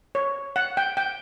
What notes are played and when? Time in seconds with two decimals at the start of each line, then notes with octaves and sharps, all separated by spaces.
0.15 C#5
0.56 F#5
0.77 G5
0.97 G5